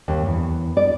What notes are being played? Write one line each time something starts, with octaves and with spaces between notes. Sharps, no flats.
D#2
E2
D5